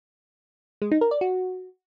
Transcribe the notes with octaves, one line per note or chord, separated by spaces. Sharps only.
G#3
D#4
A#4
D5
F#4